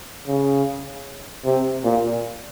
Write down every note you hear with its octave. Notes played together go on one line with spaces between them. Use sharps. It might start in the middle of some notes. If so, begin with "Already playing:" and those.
C#3
C3
A#2